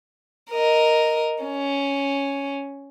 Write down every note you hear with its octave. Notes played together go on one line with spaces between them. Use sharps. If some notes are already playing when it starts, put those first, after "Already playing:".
A#4 D#5
C#4